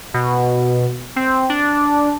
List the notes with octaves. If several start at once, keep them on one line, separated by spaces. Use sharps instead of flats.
B2
C4
D4